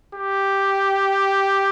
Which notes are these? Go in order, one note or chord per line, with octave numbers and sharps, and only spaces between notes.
G4